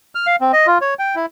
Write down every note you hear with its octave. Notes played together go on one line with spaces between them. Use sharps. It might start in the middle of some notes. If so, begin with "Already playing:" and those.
F6
F5
C4
D#5
F4
C#5
G5
E4